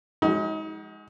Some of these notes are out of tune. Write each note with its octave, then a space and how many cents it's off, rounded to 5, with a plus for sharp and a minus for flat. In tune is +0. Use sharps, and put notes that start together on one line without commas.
G#3 +0 D#4 +35 F#4 +25